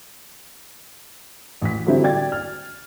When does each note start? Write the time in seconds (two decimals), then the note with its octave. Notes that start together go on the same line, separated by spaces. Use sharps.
1.62 A1 B6
1.86 D3 F#3 G3 C4 E4
2.04 D5 G5 G#6 A6
2.32 F6